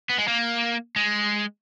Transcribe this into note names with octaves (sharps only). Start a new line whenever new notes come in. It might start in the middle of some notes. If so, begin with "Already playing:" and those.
B3
G#3
A#3
G#3